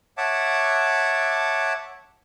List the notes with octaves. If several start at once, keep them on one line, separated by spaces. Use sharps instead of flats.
C#5 E5 F#5 A5 D6